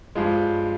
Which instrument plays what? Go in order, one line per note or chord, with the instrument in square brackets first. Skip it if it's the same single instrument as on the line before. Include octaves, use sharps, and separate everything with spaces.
[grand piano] G2 F3 G#3